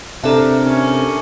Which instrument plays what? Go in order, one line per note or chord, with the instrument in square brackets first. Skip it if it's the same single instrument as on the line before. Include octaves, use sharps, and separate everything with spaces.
[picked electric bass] C3 [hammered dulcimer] D4 A#4 [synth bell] A4 E5
[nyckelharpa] C#4